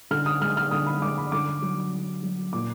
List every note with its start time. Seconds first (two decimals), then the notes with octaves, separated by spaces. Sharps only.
0.11 D3 F6
0.26 D#6
0.41 G#3 F6
0.57 F6
0.71 D3 D#6
0.86 B5
1.01 G#3 D6
1.18 B5
1.32 D3 D6
1.62 F#3
1.92 D3
2.23 F#3
2.53 A#2 D6